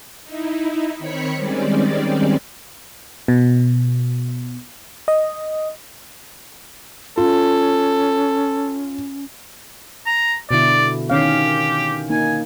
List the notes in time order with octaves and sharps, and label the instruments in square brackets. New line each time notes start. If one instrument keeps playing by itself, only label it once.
[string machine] D#4 E4
D#3 C4 C#5 B5 B6 C#7
D#3 G3 G#3 C4 C#4 D5
[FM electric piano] B2
D#5
[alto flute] C#4 [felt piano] F4 [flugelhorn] A4
[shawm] A#5
[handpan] B2 D3 E4 [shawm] D5
[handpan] D#3 C#4 F5 [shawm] G4
[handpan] A#3 D#4 [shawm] G#5